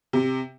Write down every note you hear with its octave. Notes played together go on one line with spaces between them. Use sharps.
C3